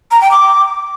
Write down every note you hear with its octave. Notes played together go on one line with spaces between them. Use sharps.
A#5
G5
D6